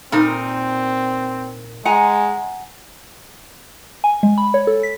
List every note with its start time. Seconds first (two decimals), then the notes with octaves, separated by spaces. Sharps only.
0.12 A#2 C4 D#4 A#4
1.85 G#3 F#5 G#5 A#5
4.04 G#5
4.23 G#3
4.38 B5
4.54 C#5
4.67 A4
4.83 B6